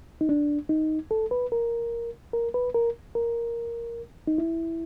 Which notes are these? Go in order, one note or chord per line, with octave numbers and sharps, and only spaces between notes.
D#4
D4
D#4
A4
B4
A#4
A#4
B4
A#4
A#4
D#4
E4